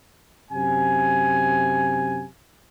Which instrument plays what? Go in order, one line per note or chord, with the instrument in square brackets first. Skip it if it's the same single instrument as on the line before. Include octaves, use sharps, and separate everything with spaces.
[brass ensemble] F#2 C3 G#5